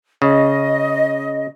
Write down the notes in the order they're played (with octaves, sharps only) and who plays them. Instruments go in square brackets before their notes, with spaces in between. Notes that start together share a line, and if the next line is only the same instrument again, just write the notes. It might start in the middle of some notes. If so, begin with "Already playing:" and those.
[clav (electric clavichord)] C#3 [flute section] D#5